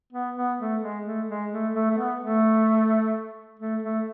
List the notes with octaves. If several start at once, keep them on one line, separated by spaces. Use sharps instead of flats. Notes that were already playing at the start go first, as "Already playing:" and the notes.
B3
B3
A3
G#3
A3
G#3
A3
A3
A3
B3
A3
A3
A3